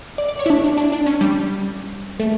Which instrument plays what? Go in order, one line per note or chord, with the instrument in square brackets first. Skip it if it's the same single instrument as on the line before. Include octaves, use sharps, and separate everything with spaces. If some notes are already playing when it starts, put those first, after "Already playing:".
[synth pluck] D5
D5
C#5
E4
D4
D4
D4
D4
C#4
G3
A3